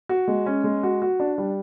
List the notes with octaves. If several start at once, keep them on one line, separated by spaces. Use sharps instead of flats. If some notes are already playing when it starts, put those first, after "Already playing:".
F#4
G#3
C#4
G#3
F#4
F#4
D4
G3